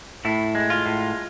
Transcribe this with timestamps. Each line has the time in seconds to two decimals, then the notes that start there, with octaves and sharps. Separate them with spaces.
0.25 A2 E4
0.55 G#3
0.70 F4
0.86 A2